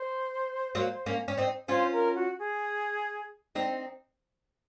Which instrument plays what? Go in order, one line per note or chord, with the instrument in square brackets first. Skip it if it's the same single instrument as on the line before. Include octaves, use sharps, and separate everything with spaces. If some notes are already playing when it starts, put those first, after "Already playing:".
Already playing: [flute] C5
[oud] F#3 A#3
A#3 C#4
C#4
C4 D#4
[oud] C#4 F4 [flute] C5
[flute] A#4
F#4
G#4
[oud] C4 D#4